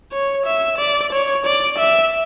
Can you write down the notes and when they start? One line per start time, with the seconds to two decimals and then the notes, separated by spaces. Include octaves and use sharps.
0.12 C#5
0.46 E5
0.78 D5
1.12 C#5
1.46 D5
1.78 E5